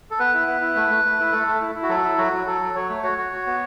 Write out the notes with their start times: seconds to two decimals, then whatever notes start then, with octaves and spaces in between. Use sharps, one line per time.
0.11 A4
0.19 B3 B4
0.34 E4
0.47 B3
0.61 E4
0.76 A3
0.90 A3
1.05 A3
1.19 E4
1.32 A3 A4
1.47 A3
1.61 E4
1.75 E4
1.83 F#4
1.89 F#3 A4
2.04 E4
2.18 F#3 F#4
2.33 F#3
2.46 F#3 A4
2.62 F#3
2.75 F#3 C#5
2.89 A3
3.03 F#4 C#5
3.18 F#4
3.33 F#4
3.46 B3